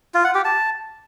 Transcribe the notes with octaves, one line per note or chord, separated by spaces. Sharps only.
F4
F#5
G4
A5